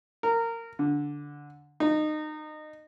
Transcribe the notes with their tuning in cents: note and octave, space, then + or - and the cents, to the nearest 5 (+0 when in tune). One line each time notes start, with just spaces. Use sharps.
A#4 -20
D3 -10
D#4 -25